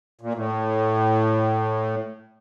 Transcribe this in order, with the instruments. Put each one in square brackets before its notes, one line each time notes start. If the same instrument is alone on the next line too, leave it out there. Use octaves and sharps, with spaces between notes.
[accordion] A#2
A2